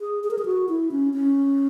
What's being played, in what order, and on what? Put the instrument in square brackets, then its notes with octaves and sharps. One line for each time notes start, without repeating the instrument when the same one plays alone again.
[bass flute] G#4
G#4
A#4
G#4
F#4
E4
C#4
C#4